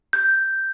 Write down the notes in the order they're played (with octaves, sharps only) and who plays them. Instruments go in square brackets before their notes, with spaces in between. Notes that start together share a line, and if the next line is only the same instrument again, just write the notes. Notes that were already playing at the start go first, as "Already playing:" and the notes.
[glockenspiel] G6